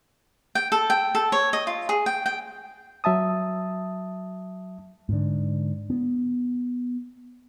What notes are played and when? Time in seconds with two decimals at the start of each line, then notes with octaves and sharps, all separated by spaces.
0.55 G5
0.72 A4
0.90 G5
1.15 A4
1.32 C#5
1.53 D#5
1.67 F4
1.89 G#4
2.06 G5
2.26 G5
3.04 F#3 E5 A5 D#6
5.09 G#2 D3
5.90 B3